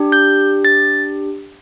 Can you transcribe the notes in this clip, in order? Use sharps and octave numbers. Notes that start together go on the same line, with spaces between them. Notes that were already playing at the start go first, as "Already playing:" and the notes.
Already playing: D4 G4
G6
A6